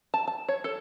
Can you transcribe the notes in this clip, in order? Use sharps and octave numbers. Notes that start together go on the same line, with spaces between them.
A5
A5
C#5
A4